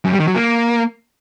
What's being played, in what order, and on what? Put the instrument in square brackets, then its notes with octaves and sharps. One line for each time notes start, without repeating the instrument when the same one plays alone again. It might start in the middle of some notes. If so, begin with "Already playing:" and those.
[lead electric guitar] F#2
G3
D#3
F#3
A#3